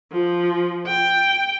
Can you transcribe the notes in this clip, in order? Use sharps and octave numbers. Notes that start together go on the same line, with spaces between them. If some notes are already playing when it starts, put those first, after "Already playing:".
F3
G5